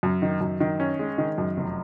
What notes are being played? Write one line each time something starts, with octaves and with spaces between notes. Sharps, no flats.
F#2
D#3
F#2
D#3
C#4
G#3
D#3
F#2
F1